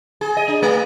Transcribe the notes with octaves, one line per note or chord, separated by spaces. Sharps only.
G#4
D#5
D4
A3